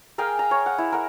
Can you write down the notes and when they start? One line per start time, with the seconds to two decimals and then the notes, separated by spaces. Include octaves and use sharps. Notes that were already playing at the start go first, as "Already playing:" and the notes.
0.18 G#4 A#4 F5 G5
0.39 A#5
0.51 C#5
0.66 F#5
0.78 E4
0.92 A#4 F#5